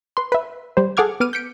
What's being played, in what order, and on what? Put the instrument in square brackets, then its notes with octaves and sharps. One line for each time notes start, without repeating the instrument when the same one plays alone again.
[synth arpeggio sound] B4 C6
B4 E5
G3 C5
G#4 A4 F#5 D6 F6 G#6
B3 D6 F6 D#7
G6 B6 C#7 D7